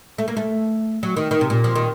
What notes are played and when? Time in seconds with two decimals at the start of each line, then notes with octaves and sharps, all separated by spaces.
0.18 A3
0.28 A#3
0.37 A3
1.03 F#3
1.17 D#3
1.31 D#3
1.41 C3
1.50 A#2
1.64 F3
1.75 D#3